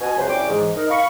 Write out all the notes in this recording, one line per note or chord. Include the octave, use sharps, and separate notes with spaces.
B2 G#5
C#2 C3 F#3 B4 C5
C2 G3 C#4 G5 D6
G#2 E3
D#4 A#4
F5 B5 C#6